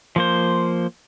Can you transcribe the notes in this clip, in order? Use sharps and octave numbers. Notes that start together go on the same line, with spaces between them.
F3 A#3 C5